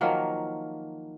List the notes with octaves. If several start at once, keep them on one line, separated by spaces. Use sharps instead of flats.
D#3 F3 F#3 A#3